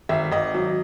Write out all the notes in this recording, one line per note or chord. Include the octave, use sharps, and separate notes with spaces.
G#1 E5
G#1 D#5
F#3